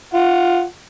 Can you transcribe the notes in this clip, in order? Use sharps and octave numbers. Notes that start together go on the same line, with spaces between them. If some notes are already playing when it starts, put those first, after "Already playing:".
F4 F#5